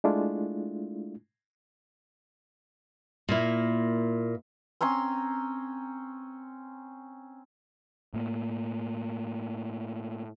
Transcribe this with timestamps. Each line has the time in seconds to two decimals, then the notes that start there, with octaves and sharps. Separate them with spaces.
0.04 G#3 A3 D4 E4 F4
3.29 A#2 A#3 E4
4.81 C4 C#4 A#5 C6
8.14 A2 A#3